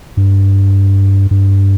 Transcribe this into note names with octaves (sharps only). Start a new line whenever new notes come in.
G2
G2